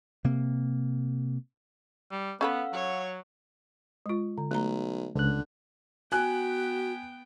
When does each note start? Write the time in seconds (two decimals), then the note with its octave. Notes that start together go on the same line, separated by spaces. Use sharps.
0.24 C3 A#3
2.12 G3
2.41 B3 C#4 A4 B4 F5 F#5 E6
2.73 F#3 C#5
4.06 G#3 F4
4.38 D3
4.51 B1 A3 A#5
5.15 C#2 D3 F#6
6.12 B3 F#4 G5 G#5 F#6